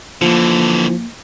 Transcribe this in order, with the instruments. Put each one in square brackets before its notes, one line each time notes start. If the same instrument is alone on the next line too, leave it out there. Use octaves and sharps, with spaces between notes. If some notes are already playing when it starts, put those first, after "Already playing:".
[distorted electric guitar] D3 E3 [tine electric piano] F3 [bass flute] A#3